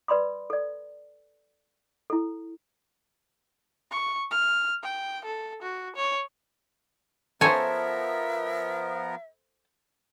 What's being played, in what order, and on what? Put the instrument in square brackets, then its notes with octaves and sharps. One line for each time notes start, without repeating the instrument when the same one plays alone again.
[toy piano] B4 D5 B5 C6 D#6
A4 D5
E4 A4
[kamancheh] C#6
F6
G5
A4
F#4
C#5
[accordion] F3 B3 A#4 [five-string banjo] A4 C5 [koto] C#5 G#5 [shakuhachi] E5